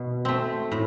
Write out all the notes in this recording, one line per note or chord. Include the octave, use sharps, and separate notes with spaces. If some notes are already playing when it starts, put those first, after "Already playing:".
Already playing: B2
A3 C4
A2